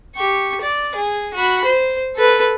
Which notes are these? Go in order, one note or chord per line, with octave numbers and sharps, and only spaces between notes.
G4 C#6
D5
G#4
F#4 B5
C5
A4 B4